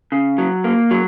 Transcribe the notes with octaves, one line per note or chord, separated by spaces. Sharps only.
C#3
F#3
A#3
F#3